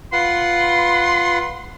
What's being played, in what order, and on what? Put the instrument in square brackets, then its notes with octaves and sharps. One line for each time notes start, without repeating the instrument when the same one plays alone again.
[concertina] F4 B4 F#5 [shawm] C6